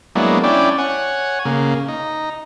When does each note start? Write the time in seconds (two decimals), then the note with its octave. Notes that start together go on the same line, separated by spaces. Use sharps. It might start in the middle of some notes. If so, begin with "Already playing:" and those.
0.15 F#3 G#3 A#3 B3 D4 E4
0.44 C#4 D4 E4 D5 G5
0.78 C#5 F#5 G#5
1.45 C#3 A#3
1.88 D#4